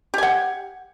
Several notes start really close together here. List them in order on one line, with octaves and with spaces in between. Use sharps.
G4 G#5 F#5